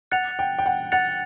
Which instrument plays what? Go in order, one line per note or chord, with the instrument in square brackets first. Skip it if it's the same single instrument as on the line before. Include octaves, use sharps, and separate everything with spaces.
[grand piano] F#5 [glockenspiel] F#6 A6 C#7 F7
[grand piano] G5
G5
F#5
[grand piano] F#5 [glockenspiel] F#6 A6 C#7 F7